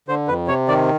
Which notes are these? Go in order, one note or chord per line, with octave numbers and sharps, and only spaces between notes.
D3 C5
F2 B4
C3 C#5
D#3 D5